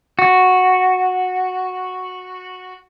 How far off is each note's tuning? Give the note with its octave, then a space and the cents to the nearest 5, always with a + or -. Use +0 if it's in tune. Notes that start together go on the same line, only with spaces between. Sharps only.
F#4 -5